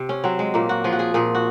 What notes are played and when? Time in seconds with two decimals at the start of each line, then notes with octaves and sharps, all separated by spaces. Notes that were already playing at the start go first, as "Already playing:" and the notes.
Already playing: C3
0.09 C#4
0.24 F#3 C4
0.39 G#3
0.54 A#2 A#3
0.69 F#4
0.84 F3 G#4
0.92 F#4
0.99 G#4
1.14 A#2 G#4
1.35 F#4